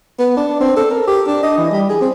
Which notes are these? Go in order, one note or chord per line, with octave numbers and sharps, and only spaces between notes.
B3
D4
C4
A4
A#4
G4
D4
D#5
E3
G3
G#4
C4